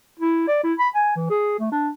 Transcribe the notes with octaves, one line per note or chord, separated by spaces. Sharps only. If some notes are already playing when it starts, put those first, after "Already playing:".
E4
D5
E4
B5
G#5
E3
G#4
A3
D4